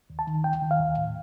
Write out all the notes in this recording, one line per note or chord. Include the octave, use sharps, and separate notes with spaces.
D#2
A5
D#3
D#2 G5
D#3
F5
D#2
A2